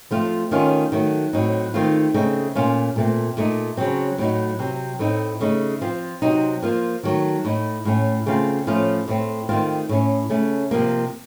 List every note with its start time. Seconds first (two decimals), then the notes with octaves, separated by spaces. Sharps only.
0.11 F3 A3 C4 F4
0.51 D#3 A3 C#4 F4
0.92 D#3 F#3 A3
1.33 A2 F#3 C4 D#4
1.74 D#3 A3 C4 F4
2.14 C#3 A3 C4 D#4
2.55 A#2 A3 C#4 F4
2.96 A#2 A3 C4
3.37 A#2 A3 D#4
3.77 C#3 F#3 C4
4.18 A2 F#3 A3 D#4
4.59 C3 F#3 C4
4.99 A2 A3 C4 D#4
5.41 C#3 A3 D#4
5.81 F3 C4 F4
6.22 C3 F#3 C4 D#4
6.62 F3 A#3 F4
7.03 D#3 F#3 A3
7.45 A2 A3 D#4
7.85 A2 A3 C#4
8.26 C#3 A3 C4 F4
8.67 A2 F3 A3 C#4 F4
9.08 A2 A3 C4
9.49 D#3 A3 C4 F4
9.89 A2 A3 C#4
10.30 C#3 A3 C#4
10.71 C3 F3 A#3